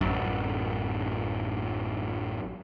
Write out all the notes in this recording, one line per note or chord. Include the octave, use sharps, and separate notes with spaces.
A1 F#2